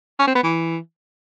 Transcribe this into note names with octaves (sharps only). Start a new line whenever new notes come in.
C#4
C4
B3
E3